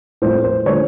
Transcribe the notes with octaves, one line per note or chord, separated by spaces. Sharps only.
A2 F3 A3 C4 C5
C5
D3 F3 A3 C#4 C#5